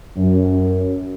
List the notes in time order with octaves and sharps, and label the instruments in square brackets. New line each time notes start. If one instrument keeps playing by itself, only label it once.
[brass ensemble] F#2